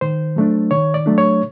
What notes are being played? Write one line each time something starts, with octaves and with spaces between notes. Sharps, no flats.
D#3 C5
F#3 A3 D4
D#3 C#5
D5
F#3 A3 D4
C#5